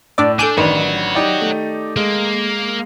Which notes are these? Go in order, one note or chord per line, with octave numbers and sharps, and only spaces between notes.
A2 D4 D5 E6
D4 A4 G#5 D6 G6 D#7
A1 D#3 D4 F#4 B4 C#5
D#4 G4 D5
A3
G#3 A#3